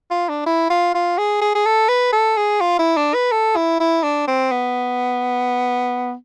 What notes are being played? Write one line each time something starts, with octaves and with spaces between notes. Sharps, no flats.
F4
D4
E4
F4
F4
G#4
G#4
G#4
A4
B4
A4
G#4
F4
E4
D4
B4
A4
E4
E4
D4
C4
B3